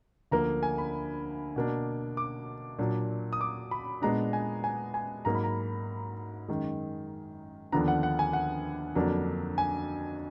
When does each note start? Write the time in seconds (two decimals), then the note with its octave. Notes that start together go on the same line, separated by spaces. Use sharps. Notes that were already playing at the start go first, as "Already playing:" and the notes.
0.31 D2 D3 F3 A#3 A#5
0.63 G#5
0.78 B5
1.56 B2 A#3 D4
2.17 D6
2.79 A#2 F#3 D4
3.33 D#6
3.41 D6
3.71 B5
4.02 A#2 G#3 B3 D4 A#5
4.33 G#5
4.64 G#5
4.94 G#5
5.25 G#2 F#3 A#3 A#5
5.35 B5
5.44 A#5
6.48 F#2 D#3 G#3
7.72 D#2 D3 F3 B3 D4 A#5
7.88 F#5
8.03 F#5
8.19 G#5
8.33 F#5
8.95 F2 D3 F#3 A#3 D4
9.58 G#5